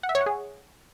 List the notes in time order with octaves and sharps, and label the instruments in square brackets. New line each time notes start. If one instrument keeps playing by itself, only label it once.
[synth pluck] F#5
E5
C#5
F#5
G#4